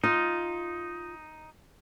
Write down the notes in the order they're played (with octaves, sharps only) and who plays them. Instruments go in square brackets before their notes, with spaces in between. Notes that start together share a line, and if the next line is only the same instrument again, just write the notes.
[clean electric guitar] D#4 [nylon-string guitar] F4